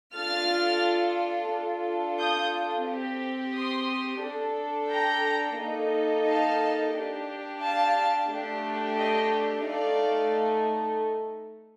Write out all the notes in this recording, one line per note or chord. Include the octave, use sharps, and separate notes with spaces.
D4 F4 A4 F6 A6
D4 F4 A4
D#6 G6
C4 G4
C6 D#6
D4 A4
G5 A#5
A#3 D#4 A4
F5 A5
D4 G4
F5 A5
A3 D4 G4
D#5 G5
A3 D#4 A4 D5 F5